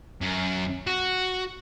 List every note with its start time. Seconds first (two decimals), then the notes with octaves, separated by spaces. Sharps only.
0.22 F#2
0.87 F#4